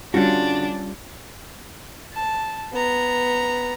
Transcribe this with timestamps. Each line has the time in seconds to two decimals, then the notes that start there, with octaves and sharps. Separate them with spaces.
0.14 D3 G3 C#4 D4 F4 F#4 G6
2.13 A5
2.72 B3 A#5